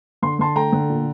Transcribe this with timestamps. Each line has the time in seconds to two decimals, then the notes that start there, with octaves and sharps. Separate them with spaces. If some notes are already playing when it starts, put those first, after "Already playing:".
0.22 D3 C6
0.39 D3 A5 C6
0.56 A3 G5 A#5
0.72 D3
0.90 A#2